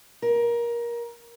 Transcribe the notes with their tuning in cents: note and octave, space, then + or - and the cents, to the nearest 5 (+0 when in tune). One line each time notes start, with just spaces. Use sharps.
A#4 +20